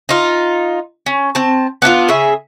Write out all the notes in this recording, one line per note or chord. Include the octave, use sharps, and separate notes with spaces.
D#4 F4
C#4
C4 A5
B3 D4 E4 F4
C#3 G#4 E5